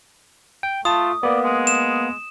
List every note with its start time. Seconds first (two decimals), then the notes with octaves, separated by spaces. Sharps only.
0.63 G5
0.85 A3 F4 A5 D#6
1.23 A#3 B3 D5
1.44 G#3
1.67 E7